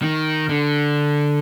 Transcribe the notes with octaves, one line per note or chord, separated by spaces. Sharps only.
D#3
D3